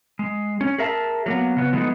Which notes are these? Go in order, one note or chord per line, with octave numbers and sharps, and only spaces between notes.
G#3
C#4
G#4 A#4 E5 F5 A5
F#3 A#3 B3
C#3 B3
F3 F#3 G#3 A3 B3 D#4